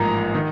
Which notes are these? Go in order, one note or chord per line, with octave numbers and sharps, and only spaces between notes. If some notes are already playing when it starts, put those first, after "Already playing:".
Already playing: A1 G#2 F3 A#3 A#5
D#3